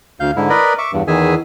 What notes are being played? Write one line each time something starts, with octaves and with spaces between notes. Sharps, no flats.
D2 F5 G6
G#2 D3 E4
A#4 B4 D5 D#5 B5
E5 C#6 D6
E2 G2
E2 D#3 E3 G#4 E5 G#5